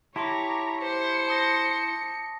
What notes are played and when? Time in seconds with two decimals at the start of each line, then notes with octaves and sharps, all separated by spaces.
0.16 E4 G4 C#5 A5 A#5 C6 D6
0.82 C5 C#7
1.28 A5 D#6 A#6